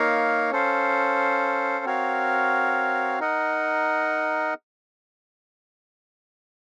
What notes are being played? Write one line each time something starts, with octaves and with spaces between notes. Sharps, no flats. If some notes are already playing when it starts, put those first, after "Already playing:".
Already playing: A#3 D#4 A#4 C#5 F5
C#4 A4 C5 F5
C4 F#4 A#4 C#5 F5
D#4 A#4 D#5 F#5